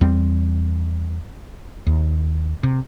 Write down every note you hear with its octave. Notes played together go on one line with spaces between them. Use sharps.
E2 G3 C4
D#2
C3